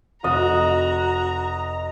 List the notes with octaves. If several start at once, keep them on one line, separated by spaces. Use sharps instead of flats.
F1 F#4 D#5 A#5